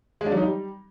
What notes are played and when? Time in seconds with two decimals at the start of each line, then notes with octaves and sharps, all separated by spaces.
0.21 G#3
0.26 D4
0.32 F#3
0.37 D#4
0.43 G3